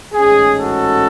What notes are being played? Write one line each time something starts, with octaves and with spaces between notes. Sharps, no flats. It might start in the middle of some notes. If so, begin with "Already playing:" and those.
A1 G#2 G#3 C#4 G#4
F#4 A4